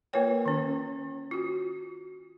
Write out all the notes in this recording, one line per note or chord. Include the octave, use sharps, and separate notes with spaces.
A#3 F4 A#4 B4 C#5 G5
D#3 C#4
F4 F#4